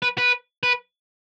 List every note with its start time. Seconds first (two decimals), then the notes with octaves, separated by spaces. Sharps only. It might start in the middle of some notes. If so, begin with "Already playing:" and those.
0.02 B4
0.18 B4
0.63 B4